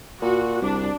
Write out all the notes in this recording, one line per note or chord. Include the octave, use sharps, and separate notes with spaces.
A#2 F#4
C2 D4